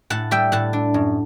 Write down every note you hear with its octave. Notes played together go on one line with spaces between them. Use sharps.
A2 F#5 A5
G3 E5 G5
A2 F#5 A5
D4
F#2